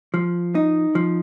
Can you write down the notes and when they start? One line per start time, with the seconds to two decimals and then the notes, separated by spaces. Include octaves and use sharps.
0.14 F3
0.55 D#4
0.95 F3